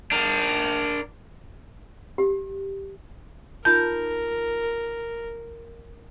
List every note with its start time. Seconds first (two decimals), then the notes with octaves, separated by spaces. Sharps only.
0.12 D4 A#4
2.18 G4
3.65 D#4 F4 A#4 A5 G6